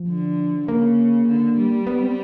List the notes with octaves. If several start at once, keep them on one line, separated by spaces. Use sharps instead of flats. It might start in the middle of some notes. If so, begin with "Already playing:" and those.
Already playing: F3
D3
C#3 A#3
D3
G3
B3
C4